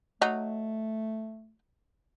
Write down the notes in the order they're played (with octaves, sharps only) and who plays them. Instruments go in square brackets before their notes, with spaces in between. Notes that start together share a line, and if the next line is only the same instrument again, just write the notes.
[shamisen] F#3 D#4 [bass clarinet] A3